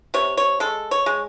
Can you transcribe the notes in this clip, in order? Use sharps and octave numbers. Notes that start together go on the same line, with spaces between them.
C3 C#5
C#5
G#3 A4
C#5
G#3